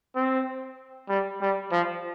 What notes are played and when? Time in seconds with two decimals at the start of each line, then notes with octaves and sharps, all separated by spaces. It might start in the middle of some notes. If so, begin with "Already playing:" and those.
0.16 C4
1.09 G3
1.42 G3
1.72 F3